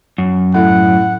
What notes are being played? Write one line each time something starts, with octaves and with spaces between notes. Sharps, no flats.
F#2
A2 F#5